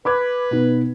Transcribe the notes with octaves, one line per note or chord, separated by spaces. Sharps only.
B4 B5 D6 G#6
B2 B3 D#4